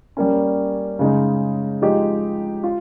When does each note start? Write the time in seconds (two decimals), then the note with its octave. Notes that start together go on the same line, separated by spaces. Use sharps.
0.17 G3 A#3 C#4
0.99 C#3 G#3 D#4
1.82 F3 G#3 D#4 G4
2.64 F4